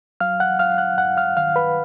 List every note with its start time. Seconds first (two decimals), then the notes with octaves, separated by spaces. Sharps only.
0.20 F#3 F5 F6
0.40 F#5 F#6
0.59 F#3 F5 F6
0.78 F#5 F#6
0.98 G2 F#5 F#6
1.17 F5 F6
1.37 D#3 F5 F6
1.56 B4 B5